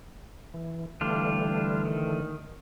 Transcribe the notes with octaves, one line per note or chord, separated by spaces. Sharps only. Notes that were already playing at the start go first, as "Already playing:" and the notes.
E3
D3 E3 G3 A3 D4 F4
D#3